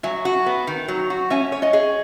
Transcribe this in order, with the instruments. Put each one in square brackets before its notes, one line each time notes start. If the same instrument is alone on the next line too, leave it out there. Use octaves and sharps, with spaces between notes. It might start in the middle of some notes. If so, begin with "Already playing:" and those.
[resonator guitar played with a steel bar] F#3 [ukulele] E5 G#5
[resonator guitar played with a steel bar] F#4
B3
D#3
F#3
F#4
[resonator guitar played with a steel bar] C#4 [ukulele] E5 G#5
[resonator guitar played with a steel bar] C#5
[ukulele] D#5 F#5
[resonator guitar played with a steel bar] G#4